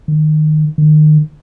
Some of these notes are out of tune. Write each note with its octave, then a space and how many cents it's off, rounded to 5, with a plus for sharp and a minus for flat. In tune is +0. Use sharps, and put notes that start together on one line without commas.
D#3 -20
D#3 -30